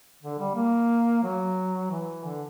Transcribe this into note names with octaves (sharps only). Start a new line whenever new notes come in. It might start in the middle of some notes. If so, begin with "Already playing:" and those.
D3
G3
A#3
F#3
E3
D3